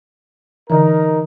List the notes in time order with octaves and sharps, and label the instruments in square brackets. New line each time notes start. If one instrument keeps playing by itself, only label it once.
[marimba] D3 E3 [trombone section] D#4 A#4